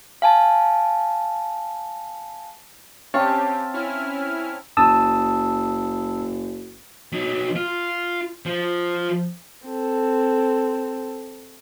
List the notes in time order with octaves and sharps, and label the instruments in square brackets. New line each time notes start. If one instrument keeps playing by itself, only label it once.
[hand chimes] F5 G#5 A5
[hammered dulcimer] C4 F5 A5 [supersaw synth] C#4 G4 [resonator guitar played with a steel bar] C#5
[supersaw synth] C#4 E4 F6
[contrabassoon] F#1 [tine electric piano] A5 D#6 E6
[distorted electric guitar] F#3 D#4
F4
F3
[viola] C4 A4